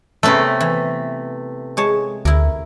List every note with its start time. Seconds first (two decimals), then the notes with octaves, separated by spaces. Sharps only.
0.23 C3 A3 B3 C#4 B4
0.61 E3
1.77 G#3 C#5 A5
2.25 D2 E4 A#4